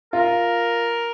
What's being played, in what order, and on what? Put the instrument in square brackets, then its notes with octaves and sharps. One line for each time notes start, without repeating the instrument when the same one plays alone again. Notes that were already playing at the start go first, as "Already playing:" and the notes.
[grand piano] F4 [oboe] A#4